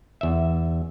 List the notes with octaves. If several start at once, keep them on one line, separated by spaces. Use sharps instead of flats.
E2 E5